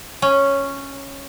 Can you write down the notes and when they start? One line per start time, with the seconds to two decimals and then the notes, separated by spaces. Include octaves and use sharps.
0.22 C#4